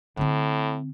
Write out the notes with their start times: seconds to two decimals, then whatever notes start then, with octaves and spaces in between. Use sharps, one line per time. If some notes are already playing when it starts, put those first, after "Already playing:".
0.17 A2 D3 C4